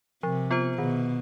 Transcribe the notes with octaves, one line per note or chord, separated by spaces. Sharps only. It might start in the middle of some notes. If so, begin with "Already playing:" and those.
C3 F3
B3 F4 C5
B2 D#3